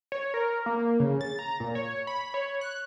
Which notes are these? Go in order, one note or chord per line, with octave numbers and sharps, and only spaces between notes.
C#5
A#4
A#3
C#3
A6
A#5
A#2
C#5
B5
C#5
F#6